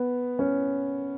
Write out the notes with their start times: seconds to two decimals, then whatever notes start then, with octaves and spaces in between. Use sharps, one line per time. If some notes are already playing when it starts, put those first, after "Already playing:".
Already playing: B3
0.39 C#4